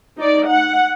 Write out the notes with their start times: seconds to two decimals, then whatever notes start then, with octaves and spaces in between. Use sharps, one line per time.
0.18 D#4 D5
0.48 F#5